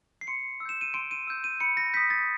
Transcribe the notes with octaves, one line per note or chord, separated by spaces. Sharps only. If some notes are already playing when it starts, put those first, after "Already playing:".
C7
C6 C#7
E6
G6 E7
D#7
C6 D7
D#7
E6 G6
D#7
B5 C#7
A#6
D#6 G6 B6
A6